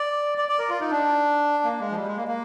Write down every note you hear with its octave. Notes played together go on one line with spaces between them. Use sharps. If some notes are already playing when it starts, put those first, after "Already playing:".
Already playing: D5
D5
D5
A#4
F4
D#4
D4
A#3
G#3
F3
G3
G#3
A#3
A#3